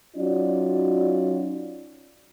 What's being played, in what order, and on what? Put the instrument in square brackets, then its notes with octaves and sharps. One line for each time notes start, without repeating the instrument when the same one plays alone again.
[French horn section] F#3 C#4 D#4 F4 F#4 D5